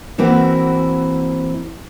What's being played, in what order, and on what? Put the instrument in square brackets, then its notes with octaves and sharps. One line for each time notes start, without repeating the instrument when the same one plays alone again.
[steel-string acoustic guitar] E3 A#3 C4 E4 F#4